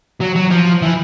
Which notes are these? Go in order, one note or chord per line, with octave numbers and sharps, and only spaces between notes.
F#3
F#3
F3
E3